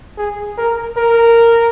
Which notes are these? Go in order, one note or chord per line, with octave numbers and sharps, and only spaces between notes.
G#4
A#4
A#4